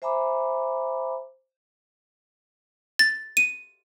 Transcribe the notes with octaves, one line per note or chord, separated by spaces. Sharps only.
C5 E5 G#5 A#5 B5 D6
A6
D#7